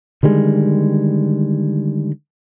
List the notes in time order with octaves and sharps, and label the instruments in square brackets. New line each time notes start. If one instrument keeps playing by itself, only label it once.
[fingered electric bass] D3 D#3 G3 G#3